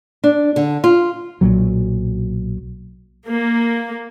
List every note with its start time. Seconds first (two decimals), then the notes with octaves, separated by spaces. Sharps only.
0.24 D4
0.56 D3
0.84 F4
1.41 B1 A#2 F#3
3.28 A#3